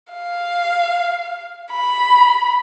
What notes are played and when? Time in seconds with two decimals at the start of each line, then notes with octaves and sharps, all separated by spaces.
0.13 F5
1.73 B5